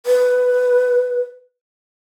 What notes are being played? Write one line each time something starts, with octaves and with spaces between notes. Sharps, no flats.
B4